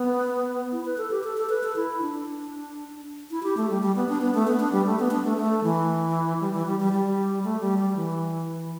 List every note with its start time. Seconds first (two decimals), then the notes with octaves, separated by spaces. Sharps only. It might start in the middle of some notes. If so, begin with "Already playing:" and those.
Already playing: B3
0.72 E4
0.85 B4
0.98 A4
1.11 G4
1.24 A4
1.37 A4
1.49 B4
1.63 A4
1.76 E4
2.02 D4
3.31 E4
3.43 G4
3.57 A3
3.70 G3
3.82 G3
3.96 B3
4.09 D4
4.21 B3
4.35 A3
4.47 B3
4.60 D4
4.73 G3
4.86 A3
4.99 B3
5.11 D4
5.24 A3
5.38 A3
5.64 E3
6.40 G3
6.53 E3
6.66 G3
6.80 G3
6.93 G3
7.44 A3
7.61 G3
7.79 G3
7.96 E3